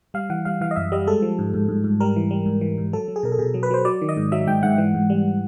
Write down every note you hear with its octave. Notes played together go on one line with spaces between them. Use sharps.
G3 F5
E3 F#5
G3 F5
E3 F5
D#5
F#2 E5
G3 D#5
G#3 A4
F3
G#2
G#2
G#2
G#2
G3 A#4
E3
G3
G#2
E3
G#2
F#3 A4
F#3
G#4
B2 A#4
A4
B2 G#4
F#3
B4
F#3 C5
F#3 D5
D#3
D#5
G#2
F#3 E5
G#2 G5
G#2 F#5
E3
G#2
G3